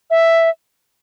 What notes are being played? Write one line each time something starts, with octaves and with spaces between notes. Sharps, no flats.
E5